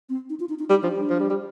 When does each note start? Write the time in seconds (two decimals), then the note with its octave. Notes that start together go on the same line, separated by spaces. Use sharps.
0.09 C4
0.30 D#4
0.40 F4
0.49 D#4
0.59 D#4
0.70 G3 D#4
0.83 F3 D4
0.96 G3 D4
1.10 F3
1.20 G3
1.30 G3